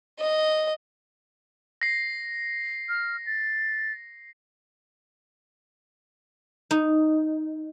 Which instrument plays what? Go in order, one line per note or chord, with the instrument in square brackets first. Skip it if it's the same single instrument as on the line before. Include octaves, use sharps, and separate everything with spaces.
[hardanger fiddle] D#5
[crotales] A#6 C7
[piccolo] F6
A6
[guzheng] D#4